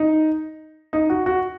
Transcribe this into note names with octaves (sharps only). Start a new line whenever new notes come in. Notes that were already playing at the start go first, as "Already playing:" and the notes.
Already playing: D#4
D#4
F#4
F#4